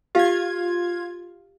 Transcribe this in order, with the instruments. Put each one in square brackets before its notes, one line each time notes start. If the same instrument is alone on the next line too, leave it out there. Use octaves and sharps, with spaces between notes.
[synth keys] F4 G#6 [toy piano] G4 F5